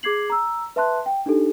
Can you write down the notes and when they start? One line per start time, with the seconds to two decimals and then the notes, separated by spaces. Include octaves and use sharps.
0.03 G#4 D6 G#6 C7 F#7
0.30 A#5 E6
0.76 B4 E5 A5 C6 F#6
1.06 G5
1.26 D4 D#4 G4 A4